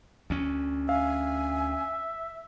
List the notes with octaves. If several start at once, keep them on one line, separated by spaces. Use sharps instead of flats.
D2 C#4
E5 F5 G#5